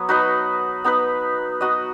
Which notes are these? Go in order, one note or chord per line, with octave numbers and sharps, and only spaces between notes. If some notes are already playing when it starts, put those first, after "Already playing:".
Already playing: F#3 B3
D#4 F#4 B4 D#5
B3 D#4 B4
D#4 F#4 D#5